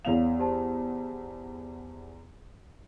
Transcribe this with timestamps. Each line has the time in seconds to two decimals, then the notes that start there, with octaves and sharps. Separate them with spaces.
0.05 E2 B3 C#5 F5 F7
0.39 G4 C5 A5